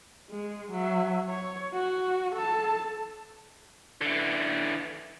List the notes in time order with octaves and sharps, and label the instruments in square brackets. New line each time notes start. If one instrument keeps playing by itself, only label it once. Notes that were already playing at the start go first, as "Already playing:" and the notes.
[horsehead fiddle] G#3
F#3 E5
C#5
F#4
A4 A5
[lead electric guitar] D3 E3